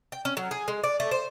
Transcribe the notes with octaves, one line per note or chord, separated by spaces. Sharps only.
G5
C#4
F#3
G#4
G#3
D5
A3
C5